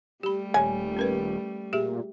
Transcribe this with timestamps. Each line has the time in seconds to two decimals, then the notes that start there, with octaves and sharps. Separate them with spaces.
0.23 G3 A3 G4 B5
0.54 D#1 C#5 G#5
0.97 C#4 A#4 B4
1.73 A#2 G4 G#4 E5